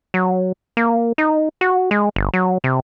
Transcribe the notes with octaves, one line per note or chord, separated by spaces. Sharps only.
F#3
A#3
D#4
F#4
G#3
G1
F#3
C3